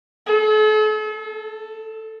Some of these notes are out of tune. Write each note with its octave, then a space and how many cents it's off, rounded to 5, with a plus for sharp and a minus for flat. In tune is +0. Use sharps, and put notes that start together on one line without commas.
A4 -45
A4 +5